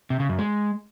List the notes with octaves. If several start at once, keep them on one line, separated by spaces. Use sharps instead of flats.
C3
C#3
F#2
G#3